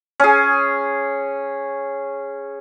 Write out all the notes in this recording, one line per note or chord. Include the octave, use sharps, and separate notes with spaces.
C#4 G#4